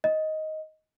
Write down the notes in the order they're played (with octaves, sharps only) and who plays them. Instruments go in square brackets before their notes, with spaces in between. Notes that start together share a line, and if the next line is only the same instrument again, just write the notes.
[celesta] D#5